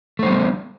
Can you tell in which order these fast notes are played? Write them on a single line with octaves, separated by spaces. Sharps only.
A3 C5 G3 B3